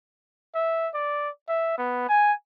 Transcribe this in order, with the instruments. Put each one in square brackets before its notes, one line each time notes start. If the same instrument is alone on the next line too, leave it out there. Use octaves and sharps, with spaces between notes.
[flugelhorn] E5
D5
E5
B3
G#5